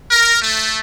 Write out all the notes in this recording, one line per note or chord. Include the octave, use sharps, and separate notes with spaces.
A#4
A3